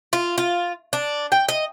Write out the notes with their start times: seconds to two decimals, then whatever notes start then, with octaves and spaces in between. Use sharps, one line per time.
0.13 F4
0.38 F4
0.93 D4
1.32 G5
1.48 D#5